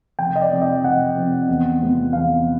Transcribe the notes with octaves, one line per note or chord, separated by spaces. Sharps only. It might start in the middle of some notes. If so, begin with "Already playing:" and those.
F1 G5
D#5
D5
F2 C3 F3
D#5
F1 F#5
F2 C3 F3
E2
C3 F3 G#3 B3
E2 F5